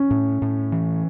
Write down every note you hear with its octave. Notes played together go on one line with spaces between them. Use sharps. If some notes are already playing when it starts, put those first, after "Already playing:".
Already playing: C#4
A2
A2
E3